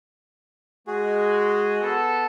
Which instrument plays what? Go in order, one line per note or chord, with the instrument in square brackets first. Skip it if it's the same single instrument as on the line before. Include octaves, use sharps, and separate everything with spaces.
[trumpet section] G#3 [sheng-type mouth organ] F#4 G#4
[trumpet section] B3 A4